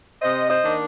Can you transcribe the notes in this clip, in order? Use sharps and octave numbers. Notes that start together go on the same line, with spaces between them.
C3 C5 D#5
C5 D#5
D#3 A#3 D4